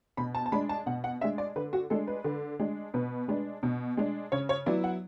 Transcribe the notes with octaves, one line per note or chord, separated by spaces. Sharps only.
B2 B5
A5
A5
G#3 D4 B5
A5
B2 F#5
F#5
G#3 D4 E5
D5
D3 B4
F#4
G#3 D4 A4
B4
D3
G#3 D4
B2 B4
G#3 D4
B2
G#3 D4
C#3 C#5
C#5
F#3 B3 E4 D5
F#5